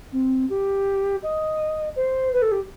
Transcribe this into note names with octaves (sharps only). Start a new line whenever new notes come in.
C4
G4
D#5
C5
B4
A4
G4